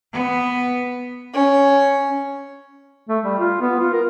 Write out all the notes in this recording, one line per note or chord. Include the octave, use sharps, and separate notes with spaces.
B3
C#4
A3
G3
F4
B3
F4
A#4